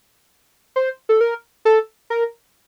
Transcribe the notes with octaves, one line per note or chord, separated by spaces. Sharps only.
C5
A4
A#4
A4
A#4